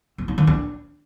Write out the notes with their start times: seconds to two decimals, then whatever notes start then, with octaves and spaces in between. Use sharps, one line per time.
0.18 C4
0.28 D#4
0.38 D#3
0.47 D4